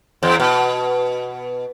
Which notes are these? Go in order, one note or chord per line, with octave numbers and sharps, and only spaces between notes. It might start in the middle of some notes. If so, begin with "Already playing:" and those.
E2
B2